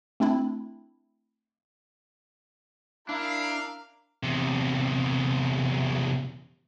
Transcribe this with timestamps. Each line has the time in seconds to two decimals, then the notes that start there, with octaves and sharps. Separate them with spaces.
0.20 A3 C4 D4 E4
3.09 D4 E4 A#4 F5
4.23 E2 C3